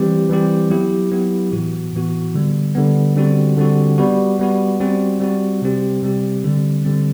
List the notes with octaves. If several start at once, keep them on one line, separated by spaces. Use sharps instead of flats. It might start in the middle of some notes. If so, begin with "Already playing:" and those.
Already playing: E3 G3 C4 G4
E3 G3 C4 G4
F#3 B3 E4 G4
F#3 B3 E4 G4
A2 E3 B3 F#4
A2 E3 B3 F#4
D3 G3 B3
D3 G3 B3
D3 G3 C4 F#4
D3 G3 C4 F#4
G3 B3 F#4
G3 B3 F#4
G3 C4 F#4
G3 C4 F#4
C3 G3 C4 G4
C3 G3 C4 G4
D3 G3 C4
D3 G3 C4